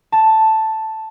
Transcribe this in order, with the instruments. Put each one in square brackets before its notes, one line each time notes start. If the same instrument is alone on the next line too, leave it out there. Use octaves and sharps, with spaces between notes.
[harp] A5